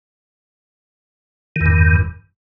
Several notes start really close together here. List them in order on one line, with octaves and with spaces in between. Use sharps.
D#3 E2 G2